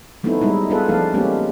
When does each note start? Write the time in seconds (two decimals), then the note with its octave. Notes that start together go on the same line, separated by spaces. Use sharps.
0.23 F#3 A3 B3 C4 D#4 E4
0.41 G3 G#3 D#4 E4
0.70 B3 D4 F4 G#4 A4 B4
0.89 F3 A3 C4 D4 A4 F5
1.14 G#3 A#3 B3 C#4 D4 G4